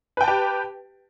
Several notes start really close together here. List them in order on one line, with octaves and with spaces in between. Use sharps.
B4 G5 A5 G4